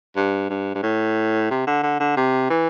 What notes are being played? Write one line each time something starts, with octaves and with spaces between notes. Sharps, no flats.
G2
G2
G2
A2
C3
D3
D3
D3
C3
E3